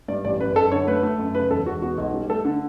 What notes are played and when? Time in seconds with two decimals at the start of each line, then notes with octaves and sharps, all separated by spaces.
0.08 G2 D5
0.24 A1 D5
0.40 F#2 B4
0.56 F#2 A4
0.72 D3 C#5
0.87 A3 B4
1.03 A3
1.19 F#2
1.35 C#3 B4
1.50 E1 A4
1.66 E1 F#4
1.82 B3 F#4
1.98 B1
2.14 G3
2.30 A3 A4
2.45 D3